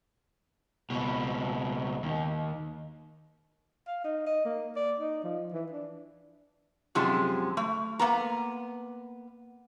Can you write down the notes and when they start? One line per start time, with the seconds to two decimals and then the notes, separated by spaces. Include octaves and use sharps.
0.90 C#2 B2
2.03 D#2
3.88 F5
4.04 D#4
4.27 D#5
4.45 A#3
4.76 D5
4.99 D#4
5.24 F3
5.53 E3
5.72 D4
6.95 F#2 C3 F3 G#3
7.57 A3
7.99 A#3 B3 A#5